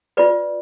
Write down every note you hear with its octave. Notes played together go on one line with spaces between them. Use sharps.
F4 B4 D5